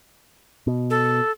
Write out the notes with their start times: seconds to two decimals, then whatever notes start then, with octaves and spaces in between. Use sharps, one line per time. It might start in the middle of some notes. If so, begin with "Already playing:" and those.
0.67 B2
0.90 A4